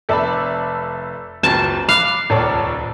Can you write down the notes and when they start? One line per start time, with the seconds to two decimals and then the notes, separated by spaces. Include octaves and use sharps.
0.09 F1 A4 D5 E5 A5 B5
1.43 F#1 C#2 F#2 A5
1.89 F5 B5 D6 F#6
2.30 D#1 C#2 A4 C#5 D5 A5